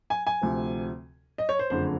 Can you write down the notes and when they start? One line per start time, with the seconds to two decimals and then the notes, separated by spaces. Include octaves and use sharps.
0.10 G#5
0.27 G#5
0.41 D2 C3 F3
1.38 D#5
1.49 C#5
1.59 C5
1.70 F#1 F2 D3 F3 C5